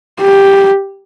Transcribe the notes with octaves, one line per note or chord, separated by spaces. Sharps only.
G4